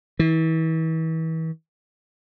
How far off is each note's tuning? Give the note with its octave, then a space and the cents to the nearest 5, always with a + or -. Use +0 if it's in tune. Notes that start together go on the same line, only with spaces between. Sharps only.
E3 -35